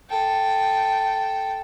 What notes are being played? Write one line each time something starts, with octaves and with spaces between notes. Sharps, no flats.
A4 G5